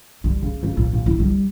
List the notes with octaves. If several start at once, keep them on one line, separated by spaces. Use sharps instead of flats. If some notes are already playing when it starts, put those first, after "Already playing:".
G3
C#3
C#2
A#2
A#2
E4
G3